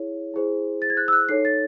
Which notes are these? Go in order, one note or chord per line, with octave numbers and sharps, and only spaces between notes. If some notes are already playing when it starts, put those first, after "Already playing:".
Already playing: E4 G#4 C#5
E4 G#4 C5
A6
G#6
F#6
E6
F#6
D#4 A4 C#5 C7
A6